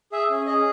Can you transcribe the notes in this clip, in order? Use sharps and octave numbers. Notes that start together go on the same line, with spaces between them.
G#4 E5
C#4
G#4 D#5